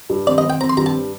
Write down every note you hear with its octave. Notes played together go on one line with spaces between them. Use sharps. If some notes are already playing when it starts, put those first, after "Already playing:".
G2
C4 D5
D#5
C4
G5
C4 A#5
C6
G2 A#5
A5